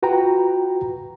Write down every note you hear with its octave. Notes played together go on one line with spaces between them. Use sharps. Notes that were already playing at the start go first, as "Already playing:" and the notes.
F4 F#4 B4 G5 A#5